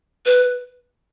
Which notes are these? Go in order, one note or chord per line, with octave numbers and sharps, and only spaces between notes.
B4